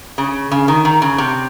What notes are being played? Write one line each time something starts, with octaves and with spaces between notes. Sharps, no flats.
C#3
C#3
D#3
D#3
C#3
C3